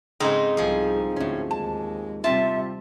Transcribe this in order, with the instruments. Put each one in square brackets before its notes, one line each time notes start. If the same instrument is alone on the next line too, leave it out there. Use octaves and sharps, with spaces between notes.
[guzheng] G#2 C4 D#4 [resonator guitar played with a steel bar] C#3 G#3
[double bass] C2 D#4 [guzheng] F3 G#4
[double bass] D2 [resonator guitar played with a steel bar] A2 C#4
[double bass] D#2 G#3 [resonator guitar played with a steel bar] A5
[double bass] C3 G3 [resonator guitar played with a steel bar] C4 F4 [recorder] E5 [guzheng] A5